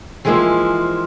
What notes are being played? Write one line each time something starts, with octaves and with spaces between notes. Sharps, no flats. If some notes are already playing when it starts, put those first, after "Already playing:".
E3 F3 G#3 A#3 C4 E4